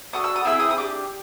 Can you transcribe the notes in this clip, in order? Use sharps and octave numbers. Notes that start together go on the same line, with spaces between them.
D4 F#4 A4 D#6
E6
D#6
C4 E4 G#4 E6
D#6
D#6
D4 G4 D6